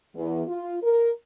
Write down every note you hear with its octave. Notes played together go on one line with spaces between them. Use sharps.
E2
F4
A#4